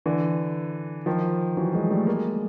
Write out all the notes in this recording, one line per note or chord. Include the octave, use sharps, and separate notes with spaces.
D3 E3
D#3 F3
E3 F#3
F#3 G#3
G3 A3
G#3 A#3